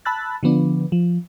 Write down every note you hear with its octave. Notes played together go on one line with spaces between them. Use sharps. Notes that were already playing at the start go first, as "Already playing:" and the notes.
A5 B5 E6 F#6 A6
D3 F3 B3 D4
F3